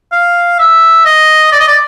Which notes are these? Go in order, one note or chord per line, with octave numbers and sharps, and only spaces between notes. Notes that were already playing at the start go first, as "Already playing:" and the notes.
F5
E5
D#5
D5
D#5
D5